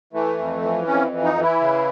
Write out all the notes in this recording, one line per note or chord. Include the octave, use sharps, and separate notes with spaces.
E3 A3
F2
E3
F2 C#4
E3
D#4
E3
E4
C#3